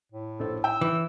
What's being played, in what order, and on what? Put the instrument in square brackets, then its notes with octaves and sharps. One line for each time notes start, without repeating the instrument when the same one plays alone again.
[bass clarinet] A2
[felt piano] A#1 C5 [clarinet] A4
[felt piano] G5 [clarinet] E6
[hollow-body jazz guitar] E3